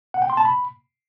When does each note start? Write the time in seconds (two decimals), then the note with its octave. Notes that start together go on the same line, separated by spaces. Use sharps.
0.14 F#5
0.22 G5
0.30 C6
0.37 A5
0.45 B5